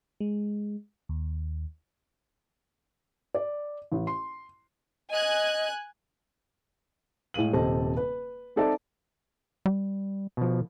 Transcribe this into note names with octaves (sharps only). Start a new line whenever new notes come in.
G#3
D#2
D5
A1
C6
D#5 G#5 F#6 G#6
A2 G#3 F5 D#7 F#7
D#1 C3 A4 C5 D#5 A5
B4
C4 D#4 A4 D5 E5 A5
G3
B2 F3